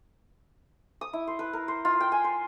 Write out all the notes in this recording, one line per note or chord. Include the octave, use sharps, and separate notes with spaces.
D#6
E4
C5
B4
A#4
C5
F4
G5
G#5
C5